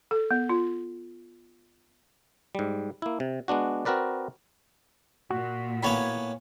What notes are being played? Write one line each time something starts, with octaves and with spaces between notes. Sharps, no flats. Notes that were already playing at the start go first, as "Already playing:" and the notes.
A4
B3
F4
G#2 G3
A#3 E4
C3
G#3 B3 D4 F#4
C4 F#4 A#4 B4 D5
A#2 F#4
A2 A#3 B3 C#5 G#5 B5